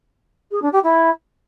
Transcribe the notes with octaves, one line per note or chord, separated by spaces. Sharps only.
G#4
D4
G4
E4